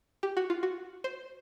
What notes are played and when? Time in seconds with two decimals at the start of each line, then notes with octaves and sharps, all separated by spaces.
0.23 G4
0.37 F#4
0.50 F4
0.63 F#4
1.04 C5